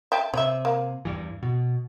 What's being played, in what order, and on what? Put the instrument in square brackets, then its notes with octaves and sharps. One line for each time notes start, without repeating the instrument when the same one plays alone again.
[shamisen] E5 G5 A5
[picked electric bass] C3 [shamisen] C#5 E5
[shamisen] A#3
[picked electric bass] E2 G2 E3
B2